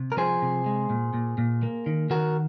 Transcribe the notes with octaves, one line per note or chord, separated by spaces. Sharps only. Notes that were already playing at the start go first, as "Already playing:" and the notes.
Already playing: C3
A#4
F3 G#4 C5
C3
G#3
A#2
A#2
A#2
A#3
D#3
D#3 F#4 A#4